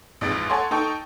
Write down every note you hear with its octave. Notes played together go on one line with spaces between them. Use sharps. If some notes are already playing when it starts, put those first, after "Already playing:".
A1 F2 G#2 A6 D7
A4 C#5 F#5 G#5 C6
D#4 A4 G5 C#6